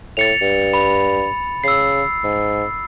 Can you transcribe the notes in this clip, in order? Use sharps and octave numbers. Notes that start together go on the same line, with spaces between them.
A2 A6 C#7 F7
G2
B5
C#3 E6 C7
G#2